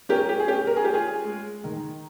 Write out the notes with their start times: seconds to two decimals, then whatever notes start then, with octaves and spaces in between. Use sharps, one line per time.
0.09 C#4 G4 A#4
0.29 G4
0.40 G#4
0.48 C#4 G4
0.67 A#4
0.76 G#4
0.84 C#4 G4
0.94 F4 G#4
1.24 G#3
1.64 D#3